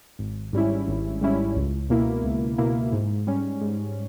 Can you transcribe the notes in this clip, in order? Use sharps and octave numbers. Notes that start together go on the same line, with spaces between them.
G#1
G#2 G3 C#4 E4
G#1
G#2 G3 C#4 E4
C#2
B2 A#3 E4
C#2
B2 A#3 E4
G#2
G3 C#4
G#2